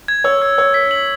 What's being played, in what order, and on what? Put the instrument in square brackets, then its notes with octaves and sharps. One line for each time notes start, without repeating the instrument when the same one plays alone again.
[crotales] G#6
[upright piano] C#5 [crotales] E6
[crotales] E6
[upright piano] C#5 [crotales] E6
[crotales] B6
F#7